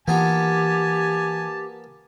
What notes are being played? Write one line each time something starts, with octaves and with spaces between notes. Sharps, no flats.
E3 A#3 B3 F4 G4 G#5 A5